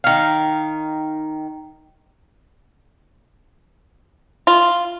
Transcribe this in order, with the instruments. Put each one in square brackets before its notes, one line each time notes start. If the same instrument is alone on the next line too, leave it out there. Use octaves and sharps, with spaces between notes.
[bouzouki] D#3 F5
[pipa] F4